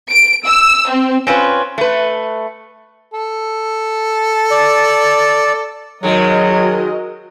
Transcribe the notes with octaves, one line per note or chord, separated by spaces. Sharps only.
D7
E6
C4
C4 C#4 F4 B4
A3 B4
A4
D5
D#3 F#3 G#3 F#4 A#4 D#5